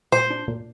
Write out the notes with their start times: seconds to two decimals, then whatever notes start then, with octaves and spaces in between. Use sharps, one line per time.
0.12 A#2 C5
0.30 D4
0.48 A#2